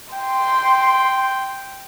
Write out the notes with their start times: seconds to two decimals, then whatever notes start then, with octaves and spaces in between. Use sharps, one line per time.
0.14 G5 C6